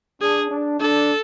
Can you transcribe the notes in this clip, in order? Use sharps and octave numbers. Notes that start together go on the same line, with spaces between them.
D4 G#4
D4
D4 A4